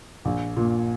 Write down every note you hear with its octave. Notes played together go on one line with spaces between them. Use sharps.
A#1
A#2